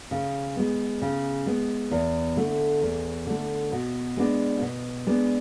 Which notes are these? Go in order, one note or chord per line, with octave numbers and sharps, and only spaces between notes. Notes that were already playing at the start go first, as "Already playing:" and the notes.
C#3
G#3 B3
C#3
G#3 B3
E2
D3 A3
E2
D3 A3
B2
G#3 B3 D4
B2
G#3 B3 D4